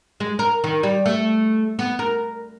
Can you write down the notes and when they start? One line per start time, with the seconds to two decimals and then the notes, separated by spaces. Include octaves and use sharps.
0.20 G#3
0.39 A#4
0.64 D#3
0.83 G3
1.06 A3
1.79 B3
1.99 A#4